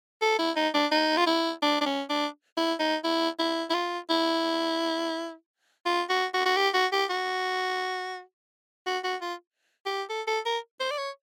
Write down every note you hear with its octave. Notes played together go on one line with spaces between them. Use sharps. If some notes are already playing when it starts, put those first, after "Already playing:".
A4
E4
D#4
D4
D#4
F4
E4
D4
D4
C#4
D4
E4
D#4
E4
E4
E4
F4
E4
F4
F#4
F#4
F#4
G4
F#4
G4
F#4
F#4
F#4
F4
G4
A4
A4
A#4
C5
D5
C#5